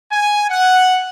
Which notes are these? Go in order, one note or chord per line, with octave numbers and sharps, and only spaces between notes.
G#5
F#5